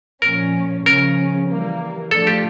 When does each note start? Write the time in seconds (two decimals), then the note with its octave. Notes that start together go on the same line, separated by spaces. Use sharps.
0.22 A#2 F3 C#4 A#4
0.86 C#3 F3 C#4 A#4
1.49 E3 G3 A#3
2.11 F3 A3 D4 F4 A4
2.27 G4